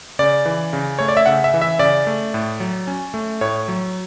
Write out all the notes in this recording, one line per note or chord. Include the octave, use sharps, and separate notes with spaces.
C#3 D5
E3
C#3
A3 C#5
D5
E5
C#3 F#5
E5
E3
E5
C#3 D5
A3
A2
F#3
C#4
A3
A2 C#5
F#3